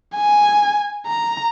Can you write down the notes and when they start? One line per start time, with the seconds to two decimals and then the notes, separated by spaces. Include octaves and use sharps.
0.16 G#5
1.06 A#5